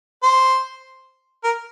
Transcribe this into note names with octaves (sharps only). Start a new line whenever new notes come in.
C5
A#4